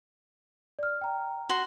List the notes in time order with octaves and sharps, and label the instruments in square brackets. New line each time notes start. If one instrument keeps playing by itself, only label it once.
[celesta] D5 F6
G5 A#5
[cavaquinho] F#4 C6